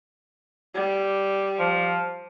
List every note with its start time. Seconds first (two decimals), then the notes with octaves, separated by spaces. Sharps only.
0.75 G3
1.59 F3